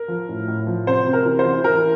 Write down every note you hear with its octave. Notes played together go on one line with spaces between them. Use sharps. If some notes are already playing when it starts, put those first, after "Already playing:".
Already playing: A#4
F3
A2
A2
F3
C3 C5
C3
A#4
E3
C5
E3
E3 A#4